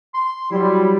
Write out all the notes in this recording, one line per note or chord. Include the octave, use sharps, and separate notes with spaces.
C6
F#3 G3 E4